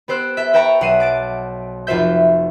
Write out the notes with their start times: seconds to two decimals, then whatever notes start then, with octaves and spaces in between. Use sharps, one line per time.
0.08 B3 G4 C5 E6 F#6
0.37 A4 E5
0.53 B4 E5 G5 A5 A#5 C#6
0.81 B1 F#5 C7 D#7 E7
1.00 D6 A6 D7
1.87 F1 F4 F#4 C5 E5 G6